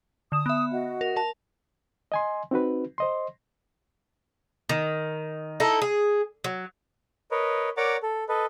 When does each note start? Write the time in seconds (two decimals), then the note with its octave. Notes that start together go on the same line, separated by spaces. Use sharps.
0.32 D3 D#6 E7
0.46 B3 E5
0.72 F#4 D#5 F#5
1.01 A#4
1.16 A#4 A5 F7
2.12 D#5 G#5 C6
2.51 C4 D#4 F#4 B4
2.98 C5 D#5 C6
4.69 D#3
5.60 D#4 E4 A4
5.82 G#4
6.44 F#3
7.31 A#4 B4 C#5 D#5
7.77 A#4 C#5 D5 F#5 A#5 D6
8.02 A4
8.29 A4 B4 D#5